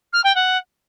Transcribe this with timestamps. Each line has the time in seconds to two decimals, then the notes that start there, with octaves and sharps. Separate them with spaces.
0.13 F6
0.24 G5
0.35 F#5